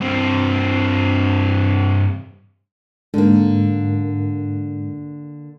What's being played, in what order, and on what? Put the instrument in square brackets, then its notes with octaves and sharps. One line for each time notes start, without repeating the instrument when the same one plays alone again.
[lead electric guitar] G2 C4
[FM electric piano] G#2 [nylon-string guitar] D3 A#3